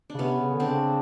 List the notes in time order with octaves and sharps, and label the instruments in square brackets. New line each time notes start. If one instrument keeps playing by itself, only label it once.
[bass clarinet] C#3 [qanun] D4
[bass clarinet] C3 [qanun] B3 C#4
[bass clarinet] C#3
D3
[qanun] C4 D4
[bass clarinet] C#3